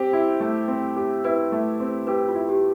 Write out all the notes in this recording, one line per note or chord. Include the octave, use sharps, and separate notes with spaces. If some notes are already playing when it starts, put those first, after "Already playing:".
Already playing: C4 G4 C5
E4
A3
C4
G4
E4 B4
A3
C4
G4 B4
F4
E4
G4